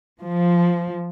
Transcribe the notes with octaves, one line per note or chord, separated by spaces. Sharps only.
F3